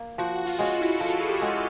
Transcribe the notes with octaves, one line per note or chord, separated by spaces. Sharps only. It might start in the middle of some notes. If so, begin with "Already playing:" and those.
Already playing: A#3
F3 F#4
F4
G#3 C#4 F#4
F4
E4
F4
F3 A4
G#4
G4
G#3 C#4 F#4